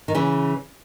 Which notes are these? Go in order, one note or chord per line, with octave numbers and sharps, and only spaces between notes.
D#3
C#3 E3